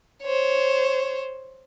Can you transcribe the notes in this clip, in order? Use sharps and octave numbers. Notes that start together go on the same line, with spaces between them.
C5 C#5